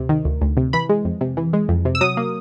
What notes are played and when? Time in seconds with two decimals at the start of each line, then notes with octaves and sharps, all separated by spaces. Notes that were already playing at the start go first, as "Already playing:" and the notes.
Already playing: D2 C3
0.09 D#3
0.25 D2
0.41 D2
0.57 C3
0.73 E3 B5
0.89 G#3
1.05 F2
1.21 C3
1.37 E3
1.53 G#3
1.69 F2
1.85 C3
1.95 E6
2.01 F#3 D#6
2.17 A#3